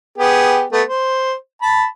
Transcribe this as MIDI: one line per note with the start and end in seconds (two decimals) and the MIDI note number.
0.18 0.63 59
0.18 0.63 67
0.18 0.63 68
0.72 0.82 57
0.72 0.82 59
0.87 1.34 72
1.62 1.85 81
1.62 1.85 83